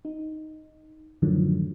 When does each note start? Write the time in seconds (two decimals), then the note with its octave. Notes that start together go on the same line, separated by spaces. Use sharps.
0.05 D#4
1.22 F#2 A2 D3 D#3 F3 F#3